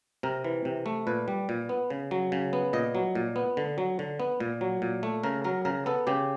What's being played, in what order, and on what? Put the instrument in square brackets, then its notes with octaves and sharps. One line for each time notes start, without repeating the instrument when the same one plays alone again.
[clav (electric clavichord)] C3 A#4
E3
C3
A3
A#2 B4
G3
A#2
B3
C#3
F#3
C#3
B3
A#2 D#5
F#3
A#2
B3
D3
F#3
D3
B3
A#2
F#3
A#2
A3
C#3 A#4
F#3 A#4
C#3 A#4
B3 A4
C#3 G4